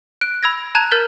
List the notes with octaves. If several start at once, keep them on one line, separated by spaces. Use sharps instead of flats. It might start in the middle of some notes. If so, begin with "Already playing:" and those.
F#6 D7
B5 E6 G#6 A#6
A5 A#5 F#6 G#6 D#7 F7
A#4 F6 G6 A6 B6 G7